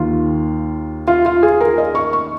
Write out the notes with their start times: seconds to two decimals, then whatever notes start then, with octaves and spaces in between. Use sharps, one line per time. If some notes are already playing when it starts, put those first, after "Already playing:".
Already playing: D#2 D#3 F4
1.08 F4
1.26 F4
1.43 G#4
1.61 A#4
1.78 D#5
1.95 C#6
2.13 C#6